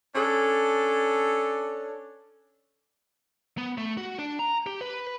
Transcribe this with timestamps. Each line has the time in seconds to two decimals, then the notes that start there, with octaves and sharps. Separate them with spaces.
0.16 C#4 D4 A4
3.58 B3
3.78 A3
3.97 F#4
4.19 D4
4.39 A#5
4.67 G4
4.81 B4